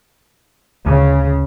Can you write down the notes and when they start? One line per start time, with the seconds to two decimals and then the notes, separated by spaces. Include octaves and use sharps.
0.86 D2 C#3